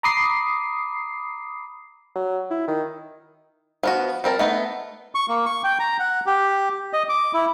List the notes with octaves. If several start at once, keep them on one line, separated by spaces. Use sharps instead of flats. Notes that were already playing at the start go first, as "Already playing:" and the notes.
A#5 B5 D6 D#6 C7
F#3
E4
D#3
F3 B3 F#4
G3 C4 A#4 A5
A3 B3 D#4
C#6
A#3
C#6
G5
A#5
F#5
G4
D#5
D6
E4